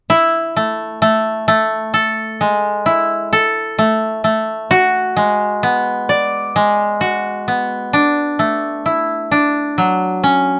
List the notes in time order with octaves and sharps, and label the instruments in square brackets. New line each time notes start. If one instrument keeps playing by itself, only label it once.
[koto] E4
A3
A3
A3
A4
G#3
E4
A4
A3
A3
F#4
G#3
B3
D5
G#3
F#4
B3
D4
A3
E4
D4
F#3
C#4